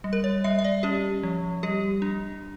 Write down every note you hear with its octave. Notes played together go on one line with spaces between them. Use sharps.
G3
A#4
C#5
G3 E5
E5
D5
C#4 G4
F3
G3 G4
D4